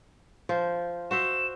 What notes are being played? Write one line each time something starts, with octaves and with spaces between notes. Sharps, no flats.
F3 C5
F#4 C5 E5 E7